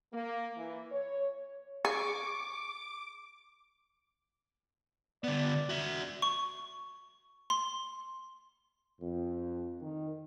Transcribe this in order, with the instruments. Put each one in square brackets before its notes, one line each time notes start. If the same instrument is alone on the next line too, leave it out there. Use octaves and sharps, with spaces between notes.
[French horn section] A#3
E3
C#5
[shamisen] G#4 [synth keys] C#6 [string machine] D6
[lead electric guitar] D3 B3 [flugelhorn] D5
[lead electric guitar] F#4 E5
[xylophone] C#6
C6
[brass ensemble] F2
D#3